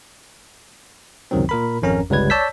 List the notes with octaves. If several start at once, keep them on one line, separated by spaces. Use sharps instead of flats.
C#2 F#2 C3 D#3 F#3 C4
A#2 A#4 B5
G#1 F2 C#4 A#4 A#5
G1 C#2 G3 B4 G#6
C#5 D5 A5 E6 G6 B6